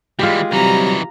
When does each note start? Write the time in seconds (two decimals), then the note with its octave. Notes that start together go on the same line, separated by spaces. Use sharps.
0.19 E3 G3 G#3 F4 G4
0.52 C3 E3 F#3 G3 D#4 A#5